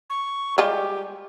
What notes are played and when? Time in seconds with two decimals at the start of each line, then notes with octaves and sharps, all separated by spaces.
0.10 C#6
0.58 G3 G#3 F4 G4